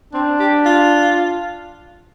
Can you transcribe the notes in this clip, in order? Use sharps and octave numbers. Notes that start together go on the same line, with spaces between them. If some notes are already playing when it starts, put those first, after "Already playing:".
C4 D4
G4
F4